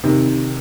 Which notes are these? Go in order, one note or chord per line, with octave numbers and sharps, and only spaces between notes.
C3 D#3